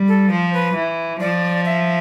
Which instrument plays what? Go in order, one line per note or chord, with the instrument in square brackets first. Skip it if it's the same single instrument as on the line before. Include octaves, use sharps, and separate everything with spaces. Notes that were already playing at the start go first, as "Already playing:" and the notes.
Already playing: [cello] G3
[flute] A4
[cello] F3 [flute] C5
[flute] B4
[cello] E3
[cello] F3 [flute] D5
[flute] E5